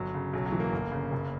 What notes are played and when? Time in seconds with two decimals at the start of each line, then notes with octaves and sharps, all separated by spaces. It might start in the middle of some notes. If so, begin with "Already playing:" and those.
Already playing: G1 F#3
0.14 C#3
0.33 B1 F#3
0.46 F#3
0.52 E3
0.60 A#3
0.72 G1
0.92 C#3
1.12 F#1